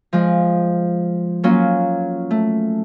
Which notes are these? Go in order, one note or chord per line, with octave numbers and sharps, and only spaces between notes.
F3 G#3
F#3 A#3 C#4 F4
A3